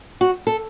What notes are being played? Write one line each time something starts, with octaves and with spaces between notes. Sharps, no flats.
F#4
A4